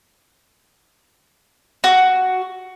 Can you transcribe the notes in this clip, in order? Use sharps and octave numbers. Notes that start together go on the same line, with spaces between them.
F#4